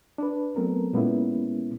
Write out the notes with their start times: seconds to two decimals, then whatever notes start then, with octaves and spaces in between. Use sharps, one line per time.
0.18 D4 B4
0.56 F#3 A3 B3 C4 A4 A#4
0.93 A#2 G#3 A#3 B3 C#4 E4